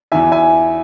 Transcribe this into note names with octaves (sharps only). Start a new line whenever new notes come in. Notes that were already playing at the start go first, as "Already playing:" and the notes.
E2 E3 E5 G#5
E5 G#5